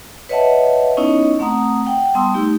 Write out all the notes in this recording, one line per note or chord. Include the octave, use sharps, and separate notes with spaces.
B4 C#5 D#5 E5 F#5 A5
B3 C#4 D#4 E4 C#5 D#5
A3 C4 F#5 A#5 D#6
F#5 G5
G3 B3 A5 C6 D#6 E6
A3 D#4 G4